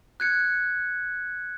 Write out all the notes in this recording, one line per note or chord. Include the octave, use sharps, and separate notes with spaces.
F#6 G#6 C#7